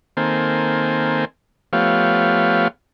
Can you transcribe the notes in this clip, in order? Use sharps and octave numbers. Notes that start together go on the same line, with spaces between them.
D#3 A#3 C4 A4 C5 G#5
F3 A3 B3 G4 C#5 F5